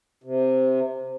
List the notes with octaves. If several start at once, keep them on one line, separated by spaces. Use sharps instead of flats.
C3